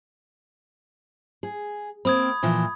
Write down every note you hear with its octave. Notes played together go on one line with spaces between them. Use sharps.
G#4
A#3 C4 B5 D#6 G#6
A#2 E3 F3